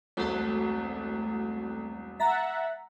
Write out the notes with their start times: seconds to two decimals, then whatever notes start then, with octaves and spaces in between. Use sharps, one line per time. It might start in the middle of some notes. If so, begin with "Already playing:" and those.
0.17 E1 C2 A3 C4 F#4
2.20 E5 F#5 A#5 A6 B6